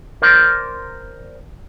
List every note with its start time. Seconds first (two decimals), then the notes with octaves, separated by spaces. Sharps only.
0.22 A#4 C5 D5